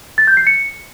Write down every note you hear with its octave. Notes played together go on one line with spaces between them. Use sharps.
A6
G6
C7
C#7